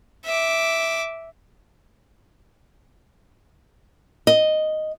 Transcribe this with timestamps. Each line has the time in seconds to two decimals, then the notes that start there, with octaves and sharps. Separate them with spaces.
0.25 E5 D6
4.27 D#5